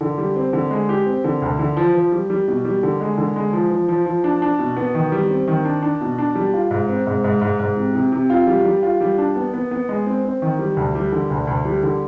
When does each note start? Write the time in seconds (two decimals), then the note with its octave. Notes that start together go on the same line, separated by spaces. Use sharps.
0.01 D3
0.18 G3
0.36 C4
0.53 D3
0.71 G#3
0.89 G4
1.06 C4
1.24 D3
1.42 D2
1.59 D3
1.77 F3
1.94 F3
2.12 G3
2.30 G3
2.48 B2
2.65 G3
2.83 D3
3.01 G#3
3.18 D3
3.36 G#3
3.53 F3
3.71 F3
3.88 F3
4.06 F3
4.24 D4
4.42 D4
4.59 B2
4.77 B3
4.95 D#3
5.12 G3
5.30 C4
5.48 D#3
5.65 D4
5.82 D4
6.01 B2
6.18 D4
6.35 G3
6.54 F4
6.71 G#2
6.89 C4
7.07 G#2
7.24 G#2
7.41 G#2
7.60 G#2
7.77 C3
7.95 C3
8.12 C3
8.30 F4
8.47 G3
8.65 G3
8.83 F4
9.01 G3
9.18 D4
9.36 B3
9.54 B3
9.71 B3
9.89 G#3
10.06 C4
10.25 C4
10.42 D#3
10.59 G3
10.77 D2
10.95 G3
11.12 D3
11.30 D2
11.47 D2
11.65 G3
11.83 D3